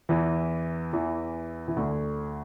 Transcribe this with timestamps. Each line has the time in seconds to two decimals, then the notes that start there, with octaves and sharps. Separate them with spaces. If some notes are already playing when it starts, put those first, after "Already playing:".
0.09 E2 E3
0.93 E2 E3
1.68 E3
1.76 D2 D3